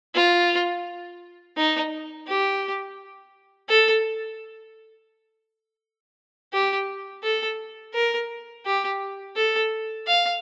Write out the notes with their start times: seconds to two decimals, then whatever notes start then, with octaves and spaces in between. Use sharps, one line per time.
0.15 F4
1.57 D#4
2.28 G4
3.69 A4
6.53 G4
7.23 A4
7.94 A#4
8.66 G4
9.37 A4
10.07 F5